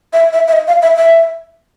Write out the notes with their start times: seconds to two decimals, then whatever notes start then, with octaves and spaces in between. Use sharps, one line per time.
0.13 E5
0.33 E5
0.48 E5
0.53 D#5
0.67 F5
0.82 E5
0.97 E5